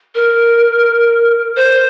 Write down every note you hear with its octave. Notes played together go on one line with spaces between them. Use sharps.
A#4
C5